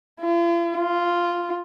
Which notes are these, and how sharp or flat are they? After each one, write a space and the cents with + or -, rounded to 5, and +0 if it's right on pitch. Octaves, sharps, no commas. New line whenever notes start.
F4 -45
F4 -5